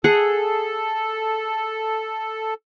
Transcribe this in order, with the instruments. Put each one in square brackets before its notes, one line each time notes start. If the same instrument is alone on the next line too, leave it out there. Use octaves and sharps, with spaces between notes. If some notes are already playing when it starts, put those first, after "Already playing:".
[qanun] G#4 F#5 [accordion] A4